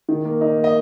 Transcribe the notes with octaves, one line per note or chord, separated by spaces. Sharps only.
D#3
A#3
D#4
A#3
D#5